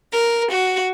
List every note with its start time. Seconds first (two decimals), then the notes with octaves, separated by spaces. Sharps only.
0.13 A#4
0.51 F#4